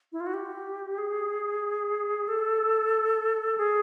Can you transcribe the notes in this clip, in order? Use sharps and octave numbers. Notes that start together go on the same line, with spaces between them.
E4
F4
F#4
G4
G#4
A4
G#4